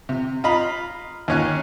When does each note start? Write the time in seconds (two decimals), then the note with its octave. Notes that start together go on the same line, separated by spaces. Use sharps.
0.09 C3
0.44 F4 D#5 A#5 B5
1.28 D#2 C#4 F#6